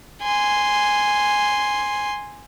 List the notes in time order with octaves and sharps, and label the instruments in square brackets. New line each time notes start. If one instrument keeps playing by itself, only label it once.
[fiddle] G#5 C6